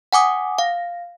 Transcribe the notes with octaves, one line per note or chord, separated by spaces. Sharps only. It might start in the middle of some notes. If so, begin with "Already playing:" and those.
F#5 G#5 D6 D#6
F5